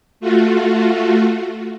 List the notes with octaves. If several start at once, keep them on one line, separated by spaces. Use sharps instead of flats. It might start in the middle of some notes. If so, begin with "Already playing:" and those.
A3 F4 F#4